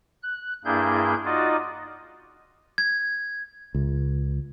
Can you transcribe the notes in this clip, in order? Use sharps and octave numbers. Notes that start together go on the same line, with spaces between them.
F#6
G2 A#3 D4 E4 G#4 G6
D#4 F4 F#4 D5 D#5
G#6
C#2